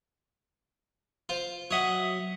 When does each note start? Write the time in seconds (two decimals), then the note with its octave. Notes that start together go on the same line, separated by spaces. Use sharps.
1.29 F4 C5
1.71 F#3 C#5 D#5 E5 F#5